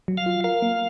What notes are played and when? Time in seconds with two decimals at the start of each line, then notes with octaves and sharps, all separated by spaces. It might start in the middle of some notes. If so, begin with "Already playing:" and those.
0.08 F#3
0.18 F5
0.26 F4
0.44 A#4 F5
0.62 A#3